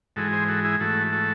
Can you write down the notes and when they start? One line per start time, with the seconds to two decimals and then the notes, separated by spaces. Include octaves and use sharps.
0.16 G#2 E3 G#3 F#4 A4
0.32 G#4 C5
0.49 F#4 A4
0.65 E4 G#4
0.80 G#2 E3 A3 F#4 A4
1.12 F#4 A4